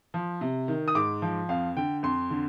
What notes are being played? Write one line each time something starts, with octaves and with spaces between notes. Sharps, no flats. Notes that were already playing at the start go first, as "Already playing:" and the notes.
F3
C3
D#3
D#6
G#2 D6
F3
F2 F5
D3 G5
F2 C6
D3